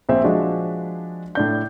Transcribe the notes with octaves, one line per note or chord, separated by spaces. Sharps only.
A#1 C4 E5
F3 G#3 D4 F#4
A2 D4 G6